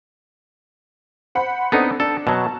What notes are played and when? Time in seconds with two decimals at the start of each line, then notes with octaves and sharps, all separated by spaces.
1.35 C5 F#5 B5
1.72 B3 C4 D4 D#4 A4
2.00 D4 A4
2.27 B2 F#3 A5